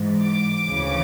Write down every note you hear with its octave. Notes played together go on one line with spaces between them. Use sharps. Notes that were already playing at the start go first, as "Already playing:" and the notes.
Already playing: G#2 E3
D6
D2 C#3 E3